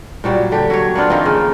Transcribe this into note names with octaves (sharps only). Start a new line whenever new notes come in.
A#2 F#3 G3
D3 G4
F#3 C#5
A#3 B3 D4 F4
D#3 F3 A#3 C4
C#3